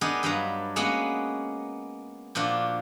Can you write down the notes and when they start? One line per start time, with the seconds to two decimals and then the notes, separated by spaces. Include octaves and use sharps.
0.01 B3 D4 D#4 G#4 A#4
0.23 G2 F#3 D4 B4 F5 A#5
0.76 G#3 A#3 B3 C#4 F#4 F#5
2.35 A#2 F3 D4 F4 F#4